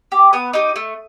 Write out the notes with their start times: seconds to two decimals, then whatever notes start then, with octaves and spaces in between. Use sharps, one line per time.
0.12 G4
0.33 B3 D#6
0.53 D#4 G4 D#6
0.76 A3